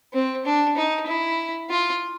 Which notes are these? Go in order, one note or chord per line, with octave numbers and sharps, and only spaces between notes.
C4
D4
D#4
E4
F4